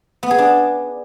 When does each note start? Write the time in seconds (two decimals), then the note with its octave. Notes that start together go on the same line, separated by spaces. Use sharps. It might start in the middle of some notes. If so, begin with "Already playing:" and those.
0.23 B3
0.31 G#4
0.38 D4